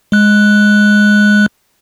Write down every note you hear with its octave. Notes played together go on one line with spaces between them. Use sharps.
G#3 F#6